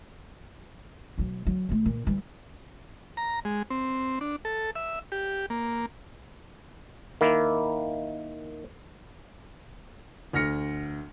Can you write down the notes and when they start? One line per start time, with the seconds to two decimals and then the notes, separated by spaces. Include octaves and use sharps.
1.18 B2 F#3
1.47 F#3
1.69 B1 A3
1.86 A#2
2.07 E3 G3
3.17 A#5
3.45 G#3
3.70 C4
4.21 D4
4.45 A4
4.76 E5
5.12 G4
5.50 A#3
7.21 D#3 A#3 E4
10.33 D2 F6 A#6 C#7